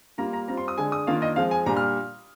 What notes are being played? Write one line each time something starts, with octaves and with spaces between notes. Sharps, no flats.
G3 A#3 F4 A#5
A#5
G3 C4 F4 A#5
C6
D#6
D3 G#3 D4 G#5
D#6
D#3 A#3 D4 F4 F5
D#5
F3 G#3 C4 F5
G#5
A#2 G3 D4 A#5
F6